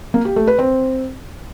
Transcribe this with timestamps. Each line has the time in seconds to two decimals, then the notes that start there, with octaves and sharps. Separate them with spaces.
0.14 A#3
0.25 G4
0.36 A3
0.47 B4
0.59 C4